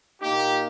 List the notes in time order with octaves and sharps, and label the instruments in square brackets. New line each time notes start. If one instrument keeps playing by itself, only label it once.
[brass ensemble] A#2 A#3 D#4 G4